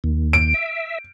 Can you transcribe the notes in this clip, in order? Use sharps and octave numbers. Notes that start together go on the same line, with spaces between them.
D#2
D7
E5